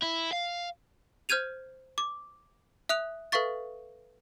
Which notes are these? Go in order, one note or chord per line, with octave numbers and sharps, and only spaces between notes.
E4
F5
C5 F6 G6 G#6 D#7 F7
D6
E5 D#6 F#6 F7
A4 B4 E5 F5 C#6 A6